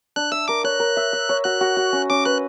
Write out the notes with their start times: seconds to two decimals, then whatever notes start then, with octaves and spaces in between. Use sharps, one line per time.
0.16 D4 F#6
0.32 E5 E6
0.48 A#4 D6
0.64 C#5 F#6
0.80 A#4
0.97 E5
1.13 E5
1.29 C#5
1.44 F#4 F#6
1.61 F#4
1.77 F#4
1.93 C#4
2.10 C#4 D6
2.25 B4 F#6